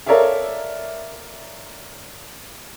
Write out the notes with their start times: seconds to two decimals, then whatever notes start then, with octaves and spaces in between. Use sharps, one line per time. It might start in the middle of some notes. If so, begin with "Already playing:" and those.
0.06 A4 A#4 C#5 D5 E5 F5